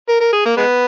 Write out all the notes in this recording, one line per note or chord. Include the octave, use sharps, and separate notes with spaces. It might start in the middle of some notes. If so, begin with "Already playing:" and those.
A#4
A#4
G#4
A#3
G#3 B3